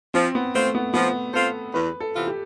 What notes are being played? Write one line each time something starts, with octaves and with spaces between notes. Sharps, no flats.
F3 C4
B3
A3 C4 F4 C5
B3
F3 B3
C4 F4 A4 C5
E2 B4
A4
C3 E3 B3 F4
G4